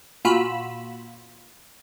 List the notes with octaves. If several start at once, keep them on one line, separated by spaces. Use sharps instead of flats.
A#2 F4 F#4 B5 E6